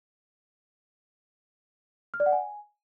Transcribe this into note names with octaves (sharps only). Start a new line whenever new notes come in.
F6
D5
F#5
G#5